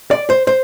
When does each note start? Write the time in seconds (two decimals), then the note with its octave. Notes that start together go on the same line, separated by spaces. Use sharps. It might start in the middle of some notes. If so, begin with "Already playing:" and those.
0.11 D5
0.30 C5
0.47 C5